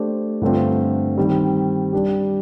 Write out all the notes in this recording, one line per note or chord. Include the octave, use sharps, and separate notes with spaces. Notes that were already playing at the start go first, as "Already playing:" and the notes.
Already playing: A3 D4 G4 C5
G2 D3 A3 C4 F4
D#3 G3 C4
G3 D4 G4